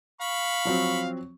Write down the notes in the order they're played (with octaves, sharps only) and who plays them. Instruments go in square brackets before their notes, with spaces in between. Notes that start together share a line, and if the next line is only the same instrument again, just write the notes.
[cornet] F5 [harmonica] B5 C#6
[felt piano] F3 F#3 C4